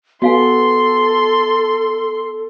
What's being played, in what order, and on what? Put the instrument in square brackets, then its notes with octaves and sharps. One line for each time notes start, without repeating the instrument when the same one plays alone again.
[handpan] B3 [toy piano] F#4 F5 G#5 [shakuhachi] A4 [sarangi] C6